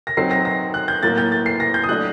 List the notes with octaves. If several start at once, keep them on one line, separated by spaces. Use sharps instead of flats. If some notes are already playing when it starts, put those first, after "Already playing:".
A#6
F#3 C4 D#4 C7
A#6
A#6
F#6
G6
A2 F#3 A#3 A6
G6
A6
C7
A#6
G6
D#6
F#3 A3 D4 F#6